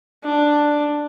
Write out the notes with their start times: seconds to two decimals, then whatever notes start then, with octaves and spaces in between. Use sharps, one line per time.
0.24 D4